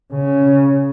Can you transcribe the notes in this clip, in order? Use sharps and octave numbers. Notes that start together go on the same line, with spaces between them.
C#3